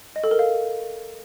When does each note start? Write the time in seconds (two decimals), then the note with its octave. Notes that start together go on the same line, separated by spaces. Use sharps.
0.16 D#5
0.23 A4
0.31 A#4
0.39 F5